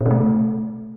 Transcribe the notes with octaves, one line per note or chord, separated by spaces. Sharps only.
B2
C3
A3